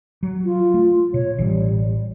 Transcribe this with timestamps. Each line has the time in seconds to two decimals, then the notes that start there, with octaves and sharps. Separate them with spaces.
0.23 F#3
0.45 F4
0.74 A3
1.14 B2 C#5
1.38 A1 E3 G3